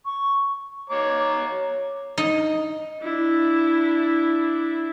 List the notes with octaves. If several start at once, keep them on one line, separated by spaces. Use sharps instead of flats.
C#6
C#5 A#5 D6
D#4
D4 E4